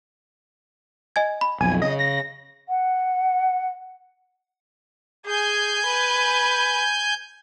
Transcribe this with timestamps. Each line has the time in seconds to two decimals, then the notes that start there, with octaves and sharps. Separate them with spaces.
1.16 D#5 G#5 G#6
1.41 B5
1.61 B1 F2 G#5
1.82 C#3 D#5
1.99 A#6
2.69 F#5
5.26 G#4 G#5 G6
5.86 B4